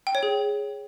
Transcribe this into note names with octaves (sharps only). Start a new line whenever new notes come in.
G5
C#5
G#4